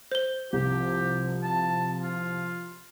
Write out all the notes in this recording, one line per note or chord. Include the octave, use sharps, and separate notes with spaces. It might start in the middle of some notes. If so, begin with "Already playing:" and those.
C5 G7
C2 C3 F3 G4
A5
F4